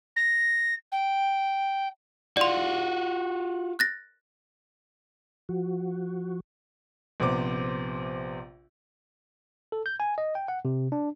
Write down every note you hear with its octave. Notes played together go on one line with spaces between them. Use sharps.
A#6
G5
F4 F#4 D5 C6
F#6 A6 A#6
F3 F#4
A#1 C3 B3 C5 D6
A4
G6
G#5
D#5
G5
F#5
C3
D4